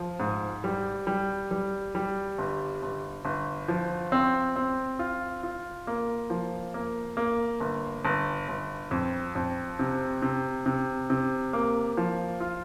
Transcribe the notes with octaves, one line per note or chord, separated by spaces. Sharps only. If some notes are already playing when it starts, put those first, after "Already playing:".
Already playing: F3
G#2
G3
G3
G3
G3
G1
G1
G1
F3
C4
C4
F4
F4
A#3
F3
A#3
A#3
G1
G1
G1
F2
F2
C3
C3
C3
C3
A#3
F3
F4